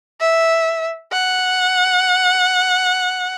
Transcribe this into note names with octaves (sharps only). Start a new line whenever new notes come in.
E5
F#5